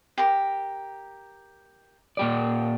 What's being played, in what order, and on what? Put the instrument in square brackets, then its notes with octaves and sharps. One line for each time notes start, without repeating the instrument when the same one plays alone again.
[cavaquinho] G4 A#4
[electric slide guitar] A#2 G4 D5